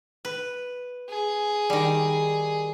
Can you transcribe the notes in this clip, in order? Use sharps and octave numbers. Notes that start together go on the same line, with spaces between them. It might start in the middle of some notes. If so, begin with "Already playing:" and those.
B4
G#4
D#3 G3